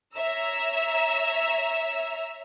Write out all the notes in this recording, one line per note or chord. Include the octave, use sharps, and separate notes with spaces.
C#5 E5 A#5 E6